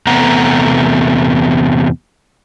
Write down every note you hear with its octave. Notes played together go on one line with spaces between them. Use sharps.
E2 C3 A3 B3 F#5 A#5